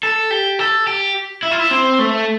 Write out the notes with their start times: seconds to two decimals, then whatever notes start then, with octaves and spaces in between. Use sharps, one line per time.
0.03 A4
0.31 G4
0.59 A4
0.87 G4
1.43 E4
1.51 F4
1.60 E4
1.71 C4
1.99 A3